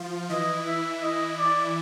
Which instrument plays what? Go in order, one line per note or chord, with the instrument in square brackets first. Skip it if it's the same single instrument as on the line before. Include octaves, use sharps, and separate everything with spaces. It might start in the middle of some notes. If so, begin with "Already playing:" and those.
Already playing: [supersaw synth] F3 F4
[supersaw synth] E3 E4 [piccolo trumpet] D#5
[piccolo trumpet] E5
D#5
D5